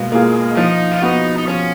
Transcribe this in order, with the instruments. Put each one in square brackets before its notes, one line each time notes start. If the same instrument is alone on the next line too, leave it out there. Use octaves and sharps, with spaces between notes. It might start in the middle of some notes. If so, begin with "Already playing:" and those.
Already playing: [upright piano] B2 A#3 F4 [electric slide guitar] G#3
[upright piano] A#3 F4 G#4
[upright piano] F3 [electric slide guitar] D#4
[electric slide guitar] F4
[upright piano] B3 F#4 [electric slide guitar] D#4
[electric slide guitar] D#4
[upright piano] F3 [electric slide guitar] C#4